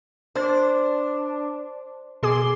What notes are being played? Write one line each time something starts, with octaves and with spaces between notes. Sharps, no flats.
D4 C5
B2 G#4 C6 D6